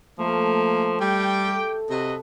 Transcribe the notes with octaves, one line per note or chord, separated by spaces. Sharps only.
F3 A3 A#3
G3 G4 G5
A4
C3 F#4 B4 D#5